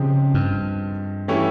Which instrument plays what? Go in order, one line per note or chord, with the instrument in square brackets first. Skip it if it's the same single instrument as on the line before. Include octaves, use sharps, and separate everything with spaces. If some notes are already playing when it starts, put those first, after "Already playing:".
Already playing: [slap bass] C#3 [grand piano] F3 G#3 C4 D#4 G4
[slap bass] G2
[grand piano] E3 A3 C#4 E4 G4